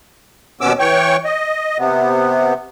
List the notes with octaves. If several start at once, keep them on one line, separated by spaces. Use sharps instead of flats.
D#2 B2 B3 C#4 D6 E6
E3 C#5 G5 C#6
D#5
C3 B3